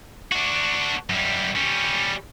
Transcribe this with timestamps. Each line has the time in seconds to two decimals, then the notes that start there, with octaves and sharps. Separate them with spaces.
0.32 D4 F#4
1.09 F#2 G3
1.55 G3 C#4